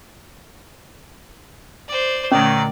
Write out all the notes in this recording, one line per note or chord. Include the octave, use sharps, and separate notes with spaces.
C5 D5
A#2 D3 D#3 F#3 A3 C#4 D5